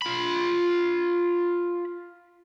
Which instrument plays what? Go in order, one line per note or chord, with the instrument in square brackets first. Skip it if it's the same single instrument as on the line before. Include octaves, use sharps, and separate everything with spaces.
[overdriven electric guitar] F4 B5